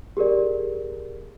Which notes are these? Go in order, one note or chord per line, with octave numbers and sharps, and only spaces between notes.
G4 G#4 A#4 D5